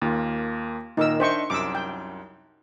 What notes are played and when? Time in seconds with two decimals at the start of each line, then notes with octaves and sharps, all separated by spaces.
0.02 D#2 A#3 F4
0.97 A#2 D#3 D#4 A#4 E6
1.20 D4 C5 D#5 E5 G5 C#6
1.50 C2 F#2 D6 E6
1.75 G5